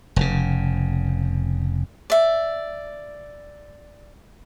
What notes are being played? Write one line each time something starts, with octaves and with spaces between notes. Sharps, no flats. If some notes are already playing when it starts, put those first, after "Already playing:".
F1 C#3
D5 E5